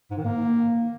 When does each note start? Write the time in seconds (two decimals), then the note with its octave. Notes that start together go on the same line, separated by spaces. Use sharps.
0.11 G#2
0.18 D#3
0.25 A#3